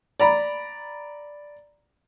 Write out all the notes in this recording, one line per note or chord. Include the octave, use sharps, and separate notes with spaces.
D5 A#5 B5